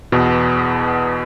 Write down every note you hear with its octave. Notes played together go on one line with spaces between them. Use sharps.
E2 B2 B3